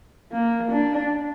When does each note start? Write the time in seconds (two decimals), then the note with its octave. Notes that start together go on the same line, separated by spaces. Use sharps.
0.32 A#3
0.72 D4